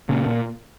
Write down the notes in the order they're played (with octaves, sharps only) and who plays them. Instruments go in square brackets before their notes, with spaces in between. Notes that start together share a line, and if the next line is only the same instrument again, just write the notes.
[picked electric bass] A#2 C#3
A#2